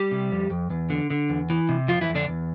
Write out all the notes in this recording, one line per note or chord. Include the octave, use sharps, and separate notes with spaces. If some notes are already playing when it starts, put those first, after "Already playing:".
Already playing: G3 G4
C3
F2
F2
E2
D3
D3
E2
E3
C3
F2 F3 F4
E3 E4
F2
D3 D4
E2